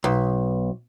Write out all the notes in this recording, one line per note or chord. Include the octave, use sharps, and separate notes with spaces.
B1